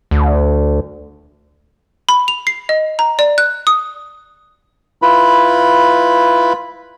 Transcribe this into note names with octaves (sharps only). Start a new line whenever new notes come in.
D2
B5
F7
C7
D#5
A#5
D5
F#6
D#6
E4 F4 B4 B5